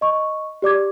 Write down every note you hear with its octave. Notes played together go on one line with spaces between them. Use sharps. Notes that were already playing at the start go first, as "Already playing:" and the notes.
D#5 C#6
G4 D5 D6 G#6